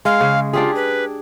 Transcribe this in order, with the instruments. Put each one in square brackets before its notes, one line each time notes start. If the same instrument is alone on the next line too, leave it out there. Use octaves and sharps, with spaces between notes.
[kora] G#3 [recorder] F5
[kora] C#3
[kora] D4 G4 G#4 [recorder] F4
[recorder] B4